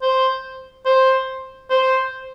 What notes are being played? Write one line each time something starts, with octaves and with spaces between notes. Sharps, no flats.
C5
C5
C5